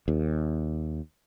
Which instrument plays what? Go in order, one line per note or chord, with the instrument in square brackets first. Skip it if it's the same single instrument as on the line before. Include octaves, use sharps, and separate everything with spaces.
[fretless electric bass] D#2